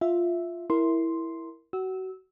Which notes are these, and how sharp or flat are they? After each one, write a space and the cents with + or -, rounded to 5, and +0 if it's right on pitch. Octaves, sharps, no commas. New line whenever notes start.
F4 +0 E5 +0
E4 +0 A#4 +0 C6 +0
F#4 +25 E6 -20